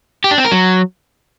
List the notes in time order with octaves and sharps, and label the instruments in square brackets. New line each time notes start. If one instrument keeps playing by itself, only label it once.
[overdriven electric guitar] G4
D4
C4
A#4
F#3